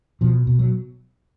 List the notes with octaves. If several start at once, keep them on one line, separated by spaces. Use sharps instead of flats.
B2 F3
B2
F#3